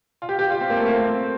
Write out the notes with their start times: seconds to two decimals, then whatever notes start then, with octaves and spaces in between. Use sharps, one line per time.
0.22 F4
0.29 G4
0.39 G4
0.50 F4
0.61 C4
0.70 A#3
0.77 A3
0.86 A#3
0.95 C4